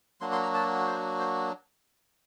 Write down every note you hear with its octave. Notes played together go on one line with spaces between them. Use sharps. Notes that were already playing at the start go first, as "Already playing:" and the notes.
F#3 A#3 D4 F#4 C6
C6
A#5
A5
C5
C5